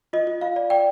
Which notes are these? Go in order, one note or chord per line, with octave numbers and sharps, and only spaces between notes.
F4 D#5
F4
F4 F5
D5
D5 G5